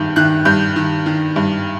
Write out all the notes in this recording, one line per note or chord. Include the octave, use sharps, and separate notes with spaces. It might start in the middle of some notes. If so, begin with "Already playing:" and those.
Already playing: G2 D#3 G6
D#3 F#6
G2 G6
D#3
D#3
G2